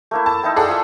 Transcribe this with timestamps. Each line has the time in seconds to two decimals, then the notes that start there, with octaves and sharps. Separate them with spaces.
0.11 A3 A#3 E4
0.26 A5
0.43 D#4 E4 G5
0.56 G#4 A4 D5 F#5
0.68 F4 E5